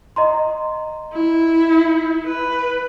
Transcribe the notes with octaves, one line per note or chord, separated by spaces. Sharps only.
D#5 A#5 C6
E4
B4